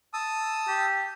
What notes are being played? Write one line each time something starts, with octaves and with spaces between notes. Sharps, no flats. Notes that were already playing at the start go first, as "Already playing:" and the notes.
A5 D#6 E6
G4